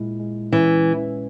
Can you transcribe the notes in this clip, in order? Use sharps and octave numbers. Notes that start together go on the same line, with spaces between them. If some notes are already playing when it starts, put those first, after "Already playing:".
Already playing: A#2 G#3 E4
G#3
E3 C#4
G#3